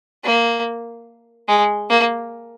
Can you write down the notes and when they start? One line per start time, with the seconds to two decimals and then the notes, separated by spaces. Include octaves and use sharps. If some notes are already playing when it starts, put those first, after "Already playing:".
0.24 A#3
1.48 G#3
1.90 A#3